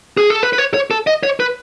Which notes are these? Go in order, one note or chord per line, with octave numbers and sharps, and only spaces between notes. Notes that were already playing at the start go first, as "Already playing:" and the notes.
G#4
A4
B4
B4
C#5
C#5
A4
D#5
C#5
B4